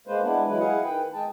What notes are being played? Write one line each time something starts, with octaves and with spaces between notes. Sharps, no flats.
G#3 A#3 B4 C5
G#3 B3 D4 E4
E3 F#3 G#3 E4 B4
E4 G#4 D#5 F5 F#5
D#3 B4 G5
G#3 G#4 G5 A5